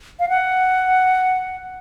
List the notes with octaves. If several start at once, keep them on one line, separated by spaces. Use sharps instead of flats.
F5
F#5